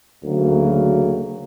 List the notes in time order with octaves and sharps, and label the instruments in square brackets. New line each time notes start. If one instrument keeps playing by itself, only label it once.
[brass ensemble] D2 C#3 F#3 A#3